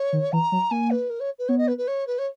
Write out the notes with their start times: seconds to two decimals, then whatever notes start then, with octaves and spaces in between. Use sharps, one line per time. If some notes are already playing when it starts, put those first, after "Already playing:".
Already playing: C#5
0.13 D#3
0.32 E3 A#5
0.52 F#3
0.71 A#3 G#5
0.90 B4
1.10 A#4
1.20 C#5
1.38 B4
1.48 B3 C#5
1.58 D#5
1.68 B4
1.78 B4
1.87 C#5
2.07 B4
2.18 C#5